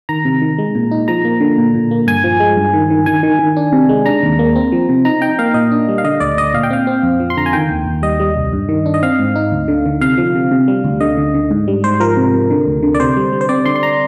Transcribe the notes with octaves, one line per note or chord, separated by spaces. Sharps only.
D#3 A#5
C3
D#3
G#3
A#2
D#4
F3 A#5
A#3
D3
A#2
A#2
A#3
G2 G#5
F3
G#3
G2
D#3
D#3
D#3 G#5
D#3
D#3
D4
C3
G#3
D4 A#5
D#2
A#3
C4
F3
C3
D#4 A#5
D#4 G5
A#3 F5
A#2 D#5
D4
G3
F5
D3 D#5
D2 D5
D2 D#5
A#2 F5
G5
C4 F5
C4
F2
F3
C6
D3 A#5
G#5
D#3 G5
D#2
D#2
G3 D#5
G3
C2
G2
D#3
D4
D#5
C4 F5
G#2
D#4
D2
D3
D3
C3 F5
F3
C3
C3
G3
D2
D3 D#5
D3
D3
G#2
G3
G#2 C5
F3 A#4
C3
C3
D3
D2
D3
D5
C3 C5
G3
G3
C5
C4 D5
D3 C6
C6
A#5